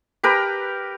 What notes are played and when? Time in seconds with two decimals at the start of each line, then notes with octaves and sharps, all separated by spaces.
0.23 G4 A#4 B4